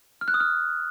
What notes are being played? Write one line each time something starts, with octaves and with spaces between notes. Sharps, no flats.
F6
F#6
D#6
F6